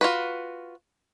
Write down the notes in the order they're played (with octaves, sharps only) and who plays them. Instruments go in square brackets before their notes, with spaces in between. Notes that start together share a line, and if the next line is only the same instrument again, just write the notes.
[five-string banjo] F4 F#4 B4